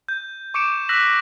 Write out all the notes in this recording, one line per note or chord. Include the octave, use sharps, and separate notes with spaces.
G6
C#6 D6 C#7 D7 E7
E6 F#6 A#6 B6 E7 F#7